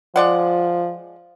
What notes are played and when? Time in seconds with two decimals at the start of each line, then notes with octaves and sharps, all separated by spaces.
0.16 F3 G#3 D5 F#5